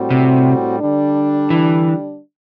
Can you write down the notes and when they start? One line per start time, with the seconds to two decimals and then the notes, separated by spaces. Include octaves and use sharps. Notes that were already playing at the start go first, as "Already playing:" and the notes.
Already playing: A2 G3 C4 F#4
0.10 C3
0.80 D3 G3 D4
1.50 E3